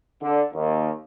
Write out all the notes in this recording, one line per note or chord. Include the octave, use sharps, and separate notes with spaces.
D3
D#2